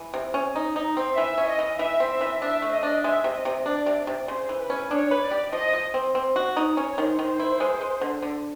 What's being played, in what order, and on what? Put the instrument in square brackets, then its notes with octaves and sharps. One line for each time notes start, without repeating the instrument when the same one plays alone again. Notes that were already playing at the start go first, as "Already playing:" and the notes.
Already playing: [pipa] E3
C3
C#4
D#4
D#4
C4
[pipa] E3 [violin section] E5
[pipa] C#4
[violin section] D#5
[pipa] E3
[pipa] E3 [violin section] E5
[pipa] C4
[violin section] E5
[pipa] E3
[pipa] D4 [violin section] E5
[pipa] A3
[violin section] D#5
[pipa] D4
[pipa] G#3 [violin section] E5
[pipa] C3
[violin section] D#5
[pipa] C3
[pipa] D4 [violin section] D5
[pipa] C3
C3
[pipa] C#3 [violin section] C5
[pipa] E3
[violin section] B4
[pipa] C#4
[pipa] D4 [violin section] C#5
[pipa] B4
[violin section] D5
[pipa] G4
[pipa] F3 [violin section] D#5
[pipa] F3
C4
C4
F#4
D#4
[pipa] C#4 [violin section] C#5
[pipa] D#3
[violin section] C5
[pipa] D#3
E4
G#3
G#3
D3
D3